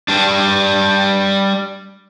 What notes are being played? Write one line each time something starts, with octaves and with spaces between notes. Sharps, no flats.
G3 D4